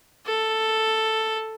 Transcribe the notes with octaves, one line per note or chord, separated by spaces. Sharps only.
A4